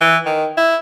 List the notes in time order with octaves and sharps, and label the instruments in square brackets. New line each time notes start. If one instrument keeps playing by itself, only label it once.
[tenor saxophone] E3
D#3
E4